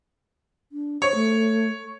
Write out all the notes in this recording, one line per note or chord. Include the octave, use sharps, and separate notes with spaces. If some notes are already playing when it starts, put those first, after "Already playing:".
D4
C5 C#5
A3